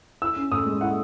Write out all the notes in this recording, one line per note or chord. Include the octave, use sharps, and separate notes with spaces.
E4 E6
C#4
A2 D#6
G#3
E4 F#5